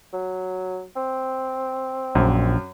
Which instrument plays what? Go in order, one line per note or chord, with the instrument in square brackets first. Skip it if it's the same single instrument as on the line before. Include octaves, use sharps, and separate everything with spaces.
[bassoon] F#3
C4
[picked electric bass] A#1 [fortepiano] F#2